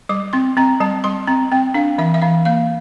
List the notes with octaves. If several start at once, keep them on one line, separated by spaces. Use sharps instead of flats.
G3 D6
C4 C6
C4 A#5
G3 A5
G3 C6
C4 A#5
C4 G5
D4 F5
E3 E5
E5
E3 F5
A#3 F5